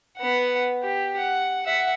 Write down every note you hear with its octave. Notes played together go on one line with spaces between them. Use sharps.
B3 F#5
G4
F#5
E5 F#5